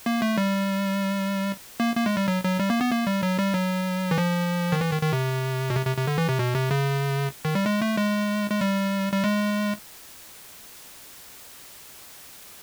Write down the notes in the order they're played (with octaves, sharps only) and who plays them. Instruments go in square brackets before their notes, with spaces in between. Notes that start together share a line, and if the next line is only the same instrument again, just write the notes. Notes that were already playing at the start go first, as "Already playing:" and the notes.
[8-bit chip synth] A#3
A3
G3
A#3
A#3
G#3
G3
F#3
F#3
G3
A#3
B3
A#3
G3
F#3
G3
F#3
E3
F3
D#3
E3
D#3
D#3
C3
B2
C3
C3
C3
D3
E3
C3
B2
C3
C#3
D#3
G3
G#3
A3
G#3
G#3
G3
G3
G#3